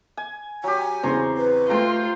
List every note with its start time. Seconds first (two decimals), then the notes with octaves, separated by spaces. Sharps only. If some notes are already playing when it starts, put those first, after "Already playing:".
0.17 G#5
0.64 F#3 G4 G#5
1.03 E2 C#3 C4 C#5 A#5 C6
1.37 B4
1.69 A3 F4 A4 C5 G5 A#5